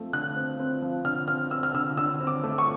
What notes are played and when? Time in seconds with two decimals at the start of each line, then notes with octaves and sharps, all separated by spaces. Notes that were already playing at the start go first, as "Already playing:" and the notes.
Already playing: F3 A3 C4
0.13 D3 F#6
0.37 C4
0.59 C4
0.82 F3
1.05 D3 F6
1.28 C4 F6
1.51 C4 E6
1.63 F6
1.74 D3 E6
1.97 D3 E6
2.20 C4
2.27 D6
2.44 A3
2.58 C#6